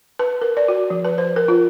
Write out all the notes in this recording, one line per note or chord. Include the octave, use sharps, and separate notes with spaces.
B4
A#4
D5
F#4
F3
B4
C5
A#4
F4